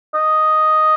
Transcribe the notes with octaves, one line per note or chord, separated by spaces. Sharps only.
D#5